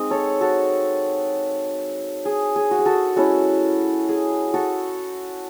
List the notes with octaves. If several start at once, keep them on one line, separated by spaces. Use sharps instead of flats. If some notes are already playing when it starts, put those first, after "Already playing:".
Already playing: G#3 C4 D#4 D#5
A4 C#5
F#4 A4
G#4
G#4
F#4
G#4
F#4 A4
G#3 C#4 E4 F#4 A4
G#4
F#4 A4